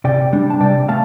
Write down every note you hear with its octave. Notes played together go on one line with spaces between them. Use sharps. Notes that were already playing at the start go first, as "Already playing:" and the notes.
C3 D5 G5
G3 D4
A5
C3 D5 G5
A3 F5 A5